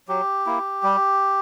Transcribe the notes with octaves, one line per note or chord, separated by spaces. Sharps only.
F#3 G4
A#3 E4
G3